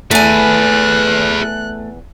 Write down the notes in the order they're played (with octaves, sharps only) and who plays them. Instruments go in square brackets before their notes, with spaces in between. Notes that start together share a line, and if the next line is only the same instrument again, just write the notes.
[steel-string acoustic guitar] E2 G#5 [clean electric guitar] A3 [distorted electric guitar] G#4 B4 [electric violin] F#6